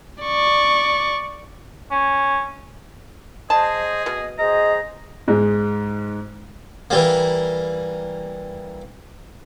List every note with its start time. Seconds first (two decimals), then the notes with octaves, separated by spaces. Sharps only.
0.23 D5 C#6
1.91 C#4
3.50 G#4 C5 D#5 A5
4.06 B2 D#5
4.38 G#4 C5 D#5 A#5
5.28 G#2 G#3
6.90 E3 G3 A#3